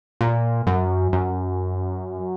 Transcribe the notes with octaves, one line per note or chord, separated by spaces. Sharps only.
A#2
F#2
F#2